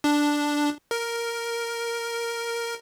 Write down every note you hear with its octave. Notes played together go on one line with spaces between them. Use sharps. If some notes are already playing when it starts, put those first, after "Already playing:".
D4
A#4